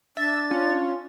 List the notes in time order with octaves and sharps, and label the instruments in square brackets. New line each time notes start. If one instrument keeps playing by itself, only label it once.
[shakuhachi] D4 [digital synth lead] E5 [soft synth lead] A6
[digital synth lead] C#4 [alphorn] F4